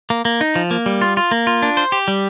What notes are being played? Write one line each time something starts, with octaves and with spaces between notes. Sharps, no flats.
A#3
A#3
D#4
F3
A#3
G3
F4
F4
A#3
F4
D4
C5
G4
G3